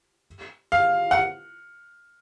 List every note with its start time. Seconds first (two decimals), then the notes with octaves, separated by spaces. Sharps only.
0.72 F5
1.11 F#5